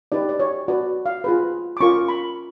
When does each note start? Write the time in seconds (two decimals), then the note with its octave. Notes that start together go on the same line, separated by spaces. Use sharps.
0.12 D#4 G4 B4 D5
0.29 D5
0.40 C#5
0.68 F#4 B4 D5
1.06 F5
1.24 F4 G#4 B4
1.77 D6
1.80 C#4 F4 A#4 C#6
2.08 B5